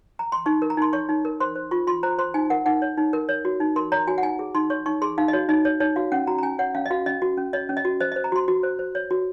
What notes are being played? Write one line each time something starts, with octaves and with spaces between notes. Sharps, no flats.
A#5
C6
D#4 C#6
A#4
A#5
D#4 C6
C#5 C#6
D#4
A#4
C5 C6
C5
F4 C#6
F4 C6
C5 A#5
C5 C6
D#4 G#5
A#4 F#5
D#4 F#5
C#5
D#4
A#4
C#5
F#4
D#4
A#4 C6
C#5 A#5
F#4 G#5
F#5
D#4 G#5
G#4
D#4 C6
C#5 C#6
D#4 C#6
G#4 C6
D#4 F5
D#5
F#4 C#5
D#4 D#5
C#5
D#4 C#5
F#4 F5
C#4 F#5
F#4 A#5
A#5
C#4 G#5
C#5 F#5
C#4 F5
D#5
F#4 F5
C#4 D#5
F#4
C#4
C#5 D#5
C#4
D#5
F#4
C5 D#5
D#5
C5
A#5
F#4 C6
F#4
C5
C5
C#5
F#4